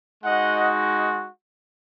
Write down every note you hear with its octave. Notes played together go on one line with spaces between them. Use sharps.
G#3 D#4 F#4 D#5 F#5